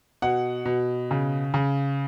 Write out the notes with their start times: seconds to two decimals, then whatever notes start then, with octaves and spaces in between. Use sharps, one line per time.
0.22 B2 F#5
0.65 B2
1.11 C#3
1.54 C#3